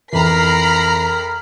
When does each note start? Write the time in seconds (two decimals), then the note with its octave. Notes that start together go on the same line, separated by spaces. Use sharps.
0.12 F2 E3 A#4 A#5 B5 C7